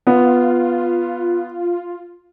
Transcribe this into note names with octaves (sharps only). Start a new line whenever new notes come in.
B3 F4